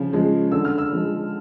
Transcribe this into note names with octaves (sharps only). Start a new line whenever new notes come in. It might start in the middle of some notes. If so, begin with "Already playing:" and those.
Already playing: C#3 F3
F3 G#3
D3 E6
F6
E6
F3 G#3